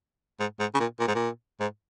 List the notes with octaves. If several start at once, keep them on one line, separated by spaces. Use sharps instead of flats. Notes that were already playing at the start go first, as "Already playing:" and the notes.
G#2
G#2
C#3
A#2
A#2
G#2
A#2
G#2